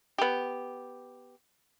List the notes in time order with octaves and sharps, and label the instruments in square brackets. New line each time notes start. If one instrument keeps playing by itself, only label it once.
[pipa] B3 G4